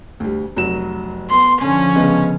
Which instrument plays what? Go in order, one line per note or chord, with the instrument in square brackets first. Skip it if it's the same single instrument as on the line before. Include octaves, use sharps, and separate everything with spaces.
[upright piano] D2 G3
F1 F#3 E7
[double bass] B3 [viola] C6
[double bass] D3 F3 [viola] C#4 [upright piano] G#5
[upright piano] C#3 G#3 B3